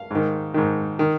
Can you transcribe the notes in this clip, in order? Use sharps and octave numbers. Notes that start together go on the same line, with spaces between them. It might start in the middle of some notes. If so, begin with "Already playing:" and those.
Already playing: F5
G#2 D#3
G#2 D#3
D#3